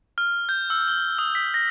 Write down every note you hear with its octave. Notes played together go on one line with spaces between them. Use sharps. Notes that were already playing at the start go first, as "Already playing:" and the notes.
F6
G6
E6
G7
D#6
B6
A#6